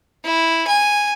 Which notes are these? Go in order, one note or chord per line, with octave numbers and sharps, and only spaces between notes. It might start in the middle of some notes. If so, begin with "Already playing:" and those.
E4
G#5